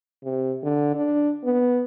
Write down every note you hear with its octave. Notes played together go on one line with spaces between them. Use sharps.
C3
D3
D4
B3